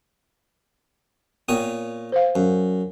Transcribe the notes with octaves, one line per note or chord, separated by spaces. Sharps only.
A#2 B3 C#5 D#6
C5 F5
F#2